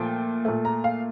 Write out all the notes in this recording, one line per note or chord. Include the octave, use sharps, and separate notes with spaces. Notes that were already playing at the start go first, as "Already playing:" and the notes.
Already playing: A#2 F3 A3 G5
A#2 A3
A#5
F5